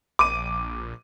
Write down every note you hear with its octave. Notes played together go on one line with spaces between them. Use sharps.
A#1 D6 D#7